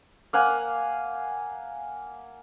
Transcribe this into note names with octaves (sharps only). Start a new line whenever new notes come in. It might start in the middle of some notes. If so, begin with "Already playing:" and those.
A#3 F5 F#5 G#5